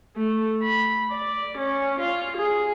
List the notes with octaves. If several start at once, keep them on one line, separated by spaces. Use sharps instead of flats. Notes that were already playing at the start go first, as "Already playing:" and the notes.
A3
B5
D5
C#4
F4
G#4